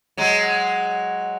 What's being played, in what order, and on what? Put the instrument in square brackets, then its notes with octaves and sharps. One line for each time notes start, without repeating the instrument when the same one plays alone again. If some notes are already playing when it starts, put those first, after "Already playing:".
[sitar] F#3 G#3